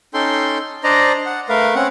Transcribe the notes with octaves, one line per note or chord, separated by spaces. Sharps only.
C#4 D#4 A4 G5 C6
D4 C5 D5 D#5 A#5
F#5
A3 A#4 B4 F5
C4 C#4 F#5